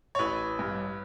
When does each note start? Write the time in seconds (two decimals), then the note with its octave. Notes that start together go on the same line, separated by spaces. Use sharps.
0.15 C#5
0.19 A1 B4
0.59 G2